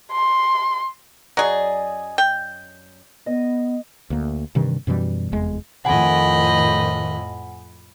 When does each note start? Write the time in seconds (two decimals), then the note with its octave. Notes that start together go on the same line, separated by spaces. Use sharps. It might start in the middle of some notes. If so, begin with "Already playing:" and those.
0.12 C6
1.37 F#2 F#3 G#4 D5 D#5
2.18 G5
3.26 B3 D#5
4.10 D2 A#3
4.55 G2 C3 D#3 E3
4.87 F#2 B2 E3 G3
5.32 F1 E2 G#3
5.85 F2 A2 D#3 D#5 F#5 G#5 B5